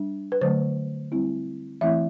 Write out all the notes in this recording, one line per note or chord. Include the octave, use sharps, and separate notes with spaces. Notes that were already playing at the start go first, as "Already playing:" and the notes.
Already playing: G3 D4
B4
D3 F#3 A3 C5
G3 C4 E4
E3 A3 C4 E4 E5